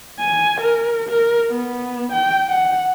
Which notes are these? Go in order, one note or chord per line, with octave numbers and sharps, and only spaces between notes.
G#5
A#4
A#4
B3
G5
F#5